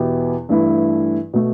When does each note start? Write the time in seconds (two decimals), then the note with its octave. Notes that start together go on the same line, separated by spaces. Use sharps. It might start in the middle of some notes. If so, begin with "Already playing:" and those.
Already playing: E2 B2 B3 E4 G4
0.49 G2 E3 A3 E4
1.33 B2 A3